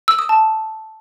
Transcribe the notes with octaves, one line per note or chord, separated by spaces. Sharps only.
E6
D#6
A5